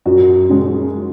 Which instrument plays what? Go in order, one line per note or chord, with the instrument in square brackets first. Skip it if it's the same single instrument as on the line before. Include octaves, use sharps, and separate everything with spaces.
[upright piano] F#2 F#4
C#3 G#3 C#4